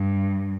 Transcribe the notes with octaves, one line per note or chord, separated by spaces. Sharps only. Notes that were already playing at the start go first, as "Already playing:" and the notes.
Already playing: G2